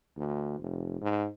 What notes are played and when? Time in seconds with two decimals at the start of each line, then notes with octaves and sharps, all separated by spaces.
0.17 D2
0.60 F1
1.01 G#2